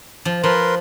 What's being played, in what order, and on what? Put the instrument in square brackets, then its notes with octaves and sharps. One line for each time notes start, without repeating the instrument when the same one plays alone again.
[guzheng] F3
[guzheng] F3 [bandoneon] A#4 B4 C6